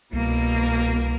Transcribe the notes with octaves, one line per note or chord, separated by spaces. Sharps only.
C2 B2 A#3